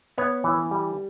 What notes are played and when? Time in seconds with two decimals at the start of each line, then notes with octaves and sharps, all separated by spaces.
0.18 B3 B4 C#5
0.44 E3
0.71 G3